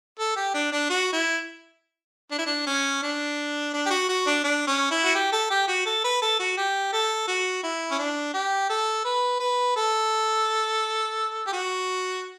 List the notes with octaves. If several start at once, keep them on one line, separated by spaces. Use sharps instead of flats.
A4
G4
D4
D4
F#4
E4
D4
E4
D4
C#4
D4
D4
G4
F#4
F#4
D4
D4
C#4
E4
F#4
G4
A4
G4
F#4
A4
B4
A4
F#4
G4
A4
F#4
E4
C#4
D4
G4
A4
B4
B4
A4
G4
F#4